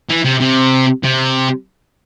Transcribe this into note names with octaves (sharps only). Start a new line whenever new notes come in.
E3
C3
C3
C3